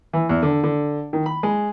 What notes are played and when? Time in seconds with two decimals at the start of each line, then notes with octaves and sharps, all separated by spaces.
0.13 E3
0.29 E2
0.43 D3
0.63 D3
1.13 D#3
1.26 B5
1.43 G#3